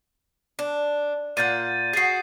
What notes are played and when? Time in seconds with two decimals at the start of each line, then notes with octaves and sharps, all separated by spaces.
0.59 D4
1.37 A#2 F4 F#5 G6 A6 D#7
1.93 F#4 G#4 A6 C7